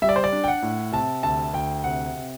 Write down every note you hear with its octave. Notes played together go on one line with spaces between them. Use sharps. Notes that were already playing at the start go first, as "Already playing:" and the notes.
G3 E5
D5
C5
D5
D4
G5
F#5
A2
C3 A5
D2 A5
D2 G5
C3 F#5
C3